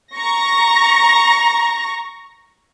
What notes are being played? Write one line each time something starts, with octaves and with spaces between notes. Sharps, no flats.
A#5 C#6 A#6